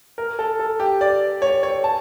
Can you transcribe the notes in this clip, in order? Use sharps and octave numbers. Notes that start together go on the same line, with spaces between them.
A#4
A4
A4
G4
D5
C#5
C#5
A5